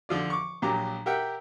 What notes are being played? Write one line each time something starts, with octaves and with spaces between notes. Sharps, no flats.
D3 F3 F4 D5
C#6 D6
A#1 A#2 F#3 G4 A#5 D6
G4 A#4 E5 F#5 G5